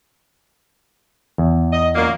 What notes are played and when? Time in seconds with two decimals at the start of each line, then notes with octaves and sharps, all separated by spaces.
1.38 E2
1.73 D#5
1.95 F#2 A#2 A#3